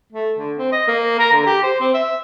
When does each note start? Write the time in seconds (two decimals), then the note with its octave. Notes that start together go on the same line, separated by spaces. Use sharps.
0.13 A3
0.39 D3
0.57 C4
0.72 D#5
0.88 A#3
1.19 A#4
1.33 D3
1.46 G4
1.63 C5
1.80 C4
1.94 E5